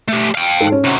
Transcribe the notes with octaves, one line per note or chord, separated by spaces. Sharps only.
A3 G4
F5 G5
G#2 A4
C#4
C3 F#3